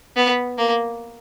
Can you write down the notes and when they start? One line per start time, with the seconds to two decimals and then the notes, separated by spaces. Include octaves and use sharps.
0.16 B3
0.58 A#3